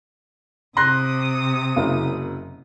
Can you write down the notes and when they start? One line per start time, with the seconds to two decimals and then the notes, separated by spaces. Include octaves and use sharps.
0.77 C3 C6 D#6 F#6 A#6
1.76 F#1 F#2